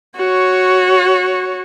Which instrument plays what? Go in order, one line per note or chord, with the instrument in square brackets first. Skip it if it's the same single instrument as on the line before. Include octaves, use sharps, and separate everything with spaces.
[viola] F#4 C#5